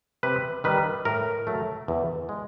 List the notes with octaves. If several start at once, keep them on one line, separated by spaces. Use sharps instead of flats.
C3 B4
D#3 G3 B4
A2 A#4
F#3 A3
E2
G#3